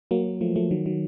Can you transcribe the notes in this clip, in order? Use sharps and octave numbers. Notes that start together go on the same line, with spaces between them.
F#3 A#3
F3 A3
F3 A3
D#3 F#3
D#3 F#3